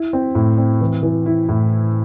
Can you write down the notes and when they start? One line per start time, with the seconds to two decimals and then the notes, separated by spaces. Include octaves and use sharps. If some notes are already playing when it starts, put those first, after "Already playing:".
Already playing: E4
0.13 C4
0.35 A2
0.58 C4
0.81 E3
1.03 E3
1.26 E4
1.49 A2